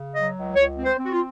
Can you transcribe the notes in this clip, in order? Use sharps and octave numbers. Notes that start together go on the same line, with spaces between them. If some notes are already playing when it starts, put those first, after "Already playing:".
Already playing: C#3
F#3 D#5
C#2
C#2 C#5
C4
C5
C4
F#4
F4